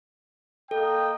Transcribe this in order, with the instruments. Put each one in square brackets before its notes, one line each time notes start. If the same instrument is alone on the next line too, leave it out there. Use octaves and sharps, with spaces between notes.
[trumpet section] A#3 D#5 G5 [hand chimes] A4